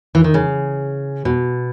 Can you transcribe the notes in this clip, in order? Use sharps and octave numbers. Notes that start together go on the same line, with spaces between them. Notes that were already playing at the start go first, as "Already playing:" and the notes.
E3
D#3
C#3
B2